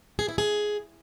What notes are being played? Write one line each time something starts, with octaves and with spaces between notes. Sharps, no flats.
G#4
E4
G#4